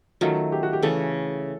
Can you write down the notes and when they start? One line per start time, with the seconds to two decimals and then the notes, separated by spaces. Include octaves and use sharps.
0.21 D#3 F#3 A3 C#4 F4
0.52 G4
0.63 F#4
0.73 G4
0.83 C#3 E3 A3 A4